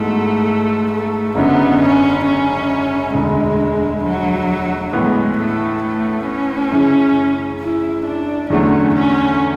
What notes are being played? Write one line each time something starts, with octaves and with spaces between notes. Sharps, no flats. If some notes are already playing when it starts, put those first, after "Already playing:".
Already playing: G#2 E3 A3 B3 F#4
A3
F#1 F#2 D3 F#3 B3
C#4
C#4
E1 D2 D3 G#3
F#3
A2 E3 G#3 B3
A3
A3
C#4
F#2 C#3 E3
E4
D4
E2 D3 F#3 A3 C#4
C#4